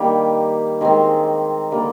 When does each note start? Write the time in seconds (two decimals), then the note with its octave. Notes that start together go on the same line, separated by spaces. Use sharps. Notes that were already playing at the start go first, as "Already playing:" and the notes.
Already playing: D#3 G3 A#3 G4
0.81 D#3 G#3 C4
1.71 D3 G3 A#3